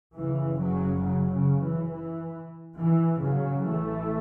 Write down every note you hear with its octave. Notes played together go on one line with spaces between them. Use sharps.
F#1 F#2 C#3 E3
C#3 F#3
C#3 F#3
C#3
E3
E3
E3
C#3 F#3
A1 A2 E3 A3